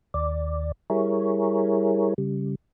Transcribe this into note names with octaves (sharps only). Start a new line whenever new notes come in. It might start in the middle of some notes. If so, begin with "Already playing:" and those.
D#2 D5
G3 E4 G#4 A#4 C#5
C#3 G3